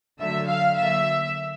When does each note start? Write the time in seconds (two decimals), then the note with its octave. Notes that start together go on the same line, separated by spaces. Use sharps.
0.19 D3 F#3 A3 E5
0.48 F5
0.77 D3 F#3 A#3 E5